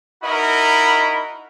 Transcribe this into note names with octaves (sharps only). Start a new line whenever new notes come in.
D#4 E4 F#4 A#4 D#5 B5